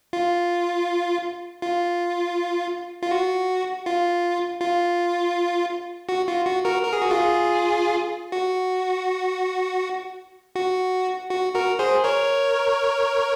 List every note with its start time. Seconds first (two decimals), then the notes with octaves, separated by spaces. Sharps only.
0.13 F4
1.62 F4
3.03 F4
3.11 F#4
3.86 F4
4.61 F4
6.09 F#4
6.28 F4
6.46 F#4
6.65 F#4 A#4
6.84 A#4
6.93 G#4
7.02 F#4
7.11 F4 G#4
8.32 F#4
10.55 F#4
11.30 F#4
11.54 F#4 A#4
11.79 G#4 C5
12.04 A#4 C#5